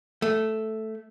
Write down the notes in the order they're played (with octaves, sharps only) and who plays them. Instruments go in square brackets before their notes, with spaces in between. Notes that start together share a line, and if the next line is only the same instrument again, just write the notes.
[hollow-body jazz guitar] A3